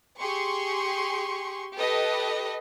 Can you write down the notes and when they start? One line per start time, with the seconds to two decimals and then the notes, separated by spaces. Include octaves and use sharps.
0.20 G4 G#4 C6 C#6
1.76 G4 A4 B4 D#5